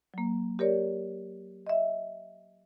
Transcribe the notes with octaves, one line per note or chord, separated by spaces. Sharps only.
F#3 A#3
G4 A#4 C#5 D5
D#5 E5